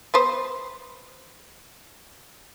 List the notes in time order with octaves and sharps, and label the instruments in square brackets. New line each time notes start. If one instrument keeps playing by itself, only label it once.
[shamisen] B3 B4 C5